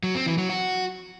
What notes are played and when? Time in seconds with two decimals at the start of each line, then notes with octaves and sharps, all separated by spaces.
0.03 F#3
0.15 C4
0.26 E3
0.38 F#3
0.49 F#4